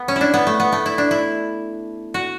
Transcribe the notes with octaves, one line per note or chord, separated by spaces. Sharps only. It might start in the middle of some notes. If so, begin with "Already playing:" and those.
Already playing: B3
C#4
D4 E4
B3
A3
B3
A3
E4
D4
E4
F#4